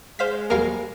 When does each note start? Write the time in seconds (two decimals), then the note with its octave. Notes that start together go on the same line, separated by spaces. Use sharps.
0.19 G#3 C5 F5 B6
0.50 F#3 G3 A#3 A#4 F5